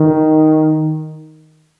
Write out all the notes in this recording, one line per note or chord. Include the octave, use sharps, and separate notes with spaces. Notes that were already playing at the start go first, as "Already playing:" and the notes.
Already playing: D#3